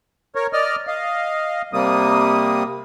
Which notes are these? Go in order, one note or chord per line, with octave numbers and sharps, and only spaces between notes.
A#4 C#5
D5 D#5 F6
D#5 F5
C3 G3 A#3 D#6